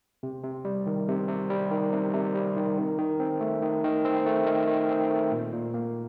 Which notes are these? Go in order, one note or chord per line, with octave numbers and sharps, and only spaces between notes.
C3
C3
G3
D#3
C3
C3
G3
D#3
C3
C3
G3
D#3
D#3
D#3
C4
A3
D#3
D#3
C4
A3
D#3
D#3
C4
A3
A#2
A#2
A#3